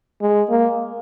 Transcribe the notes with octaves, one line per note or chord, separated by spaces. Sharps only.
G#3
A#3